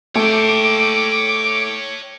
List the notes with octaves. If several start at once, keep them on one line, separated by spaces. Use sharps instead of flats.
A3 C#5 G5 D6